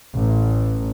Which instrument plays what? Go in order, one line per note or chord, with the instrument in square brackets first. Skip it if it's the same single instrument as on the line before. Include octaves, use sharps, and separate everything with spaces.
[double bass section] A1